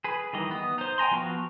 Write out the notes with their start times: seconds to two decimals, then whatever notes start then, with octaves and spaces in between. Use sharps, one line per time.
0.04 G#4 B4
0.33 D#3 E3 G3 D#5
0.51 B3 D#6
0.78 D#4 C5
0.98 G5 G#5 A#5 C6
1.11 F3 B3 F#4 F5 C#6